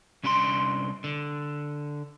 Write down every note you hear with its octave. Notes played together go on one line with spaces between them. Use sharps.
C2 C#4 D4 G#5 C6
D3